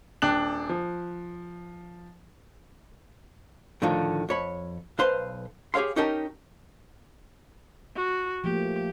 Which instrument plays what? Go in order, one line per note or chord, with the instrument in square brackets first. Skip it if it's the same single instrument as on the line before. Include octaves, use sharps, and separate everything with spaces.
[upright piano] D#1 D4 G5 F#6 F#7
F3
[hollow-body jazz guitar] A2 D3 D#3 F3
F2 C#5 B5
B1 B4 C5 F5 C6
G4 G#4 C#5 F5 C6
C#4 D#4 G4 A#4 G5 A5
[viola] F#4
[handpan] F3 A3 A#3 [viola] G4